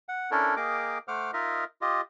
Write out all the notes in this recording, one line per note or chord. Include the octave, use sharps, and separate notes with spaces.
F#5
C#4 D4 E4 A4 A#4
A#3 G#4 A#4 D#5 G5 D6
A3 C5 F#5 D6 F6
D#4 F4 A#4 D#5 E5
F4 G4 D#5